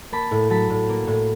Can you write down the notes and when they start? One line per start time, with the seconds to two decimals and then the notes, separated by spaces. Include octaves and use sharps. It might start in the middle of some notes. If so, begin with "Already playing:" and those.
0.12 A#3 A5 B5
0.31 A2
0.50 F#3 A5 B5
0.70 A2
0.89 A#3
1.07 A2